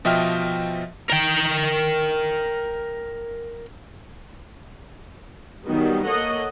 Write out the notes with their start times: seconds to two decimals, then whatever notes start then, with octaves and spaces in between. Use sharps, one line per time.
0.05 B2 F3 D#5 E5 G5 F6
1.10 A#4 G5
5.65 D#3 F#3 G3 B3 D#4
6.07 A#3 A4 C#5 D#5 F#5